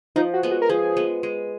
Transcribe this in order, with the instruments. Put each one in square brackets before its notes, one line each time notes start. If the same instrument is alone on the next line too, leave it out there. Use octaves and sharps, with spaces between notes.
[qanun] F3 [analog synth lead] D#4
[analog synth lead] F#4
[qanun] G#3 B3
[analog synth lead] F#4
A#4
[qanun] F3 [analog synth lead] G#4
[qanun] G#3 B3
G#3